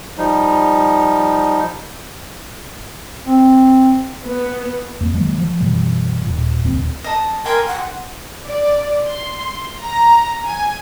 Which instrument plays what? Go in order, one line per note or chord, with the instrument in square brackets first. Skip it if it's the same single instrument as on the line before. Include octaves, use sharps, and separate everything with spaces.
[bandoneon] F3 G3 D#4
[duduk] C4
[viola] B3
[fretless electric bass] F2 A#3
D#3 F#3 G#3 A#3
F3
F#2 B2 E3 G3
D#1 A#2
E1 D2 A#2 C4
[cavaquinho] D#5 A5
[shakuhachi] A#4 [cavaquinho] G5 G#5 C6
[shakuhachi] F#5
[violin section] D5
C6
A#5
G#5